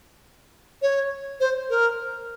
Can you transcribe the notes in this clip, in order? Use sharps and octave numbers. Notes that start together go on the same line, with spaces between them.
C#5
C5
A#4